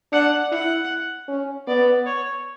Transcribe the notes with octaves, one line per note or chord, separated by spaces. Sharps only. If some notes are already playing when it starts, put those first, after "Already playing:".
D4 F#5
E4 F#5
C#4
B3 D5
C#5